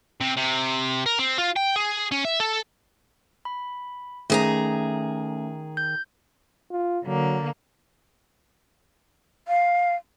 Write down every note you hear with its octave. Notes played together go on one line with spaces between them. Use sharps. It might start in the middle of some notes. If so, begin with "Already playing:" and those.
C3
C3
A#4
C4
F4
G5
G#4
C#4
E5
A4
B5
D#3 A3 C#4 G#4 A#5
G6
F4
D3 F#3 A#3
F5